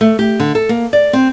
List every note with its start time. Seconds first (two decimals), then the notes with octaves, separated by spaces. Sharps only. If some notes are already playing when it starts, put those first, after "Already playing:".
0.01 A3
0.19 G4
0.40 D3
0.55 A4
0.69 A#3
0.93 D5
1.13 C4